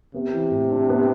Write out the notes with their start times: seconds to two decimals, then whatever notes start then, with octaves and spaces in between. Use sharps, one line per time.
0.14 C3 B3
0.33 E3
0.51 A2
0.70 D4
0.89 B3